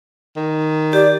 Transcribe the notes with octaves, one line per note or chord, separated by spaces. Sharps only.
D#3
G4 D5